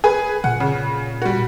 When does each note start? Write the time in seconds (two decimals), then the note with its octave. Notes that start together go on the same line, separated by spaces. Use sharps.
0.04 G#4 B4 G#5
0.44 A#2 F#5
0.60 C#3
1.22 G3 F#4